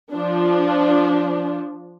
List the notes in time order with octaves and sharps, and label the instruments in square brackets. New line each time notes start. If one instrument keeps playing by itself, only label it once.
[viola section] F3 D4